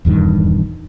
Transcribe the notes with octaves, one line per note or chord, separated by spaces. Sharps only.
D#1 E2 G2 D#3